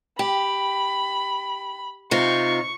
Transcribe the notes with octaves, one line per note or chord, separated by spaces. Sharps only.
G4 B5
C3 D#4 F4 C#6